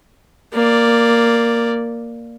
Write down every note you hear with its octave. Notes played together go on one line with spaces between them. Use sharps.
A#3 D5